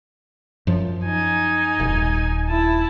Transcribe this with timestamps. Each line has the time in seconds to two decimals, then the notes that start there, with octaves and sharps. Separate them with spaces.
0.67 F#2 F3
1.05 D#4 G#5
1.80 D#1
2.50 E4 A5